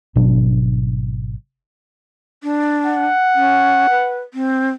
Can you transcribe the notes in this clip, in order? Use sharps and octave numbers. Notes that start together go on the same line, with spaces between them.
G#1 B2 F#3 D4
D4
F#5
C#4
B4
C4